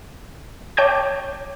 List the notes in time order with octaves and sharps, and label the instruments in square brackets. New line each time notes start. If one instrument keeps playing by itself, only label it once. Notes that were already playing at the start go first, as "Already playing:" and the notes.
[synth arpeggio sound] C#5 G5 A5 D6 G6